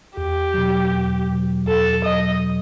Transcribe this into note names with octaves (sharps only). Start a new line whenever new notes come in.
E2 G4
B2 F#3
E2
B2 F#3
E2 A4
B2 F#3 D#5